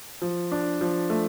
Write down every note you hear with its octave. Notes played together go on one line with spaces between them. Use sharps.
F3
D4
F3
A3